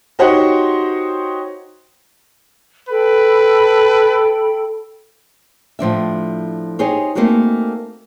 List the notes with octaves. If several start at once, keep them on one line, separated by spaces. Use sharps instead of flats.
D#4 F#4 G4 C5 C#5 F#5
A4 B4 G5 B5
A2 F3 D4 E5
D#4 G4 G#4 C5 C#5
A3 A#3 C4 D#4 F#4 G#4